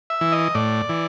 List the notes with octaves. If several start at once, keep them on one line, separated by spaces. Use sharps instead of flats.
E5
E3
D#5
A2 D5
E3